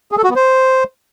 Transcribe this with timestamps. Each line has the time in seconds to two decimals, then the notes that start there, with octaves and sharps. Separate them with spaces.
0.12 G#4
0.18 A4
0.24 F#4
0.30 B3
0.36 C5